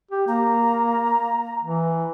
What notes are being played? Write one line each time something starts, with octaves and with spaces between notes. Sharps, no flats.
G4
A#3 A#5
E3